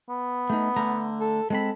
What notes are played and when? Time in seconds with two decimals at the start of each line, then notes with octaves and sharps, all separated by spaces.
0.09 B3
0.50 A3 D#4
0.76 D3 A3 A#5
1.21 A4
1.50 G#3 C4 A4 B5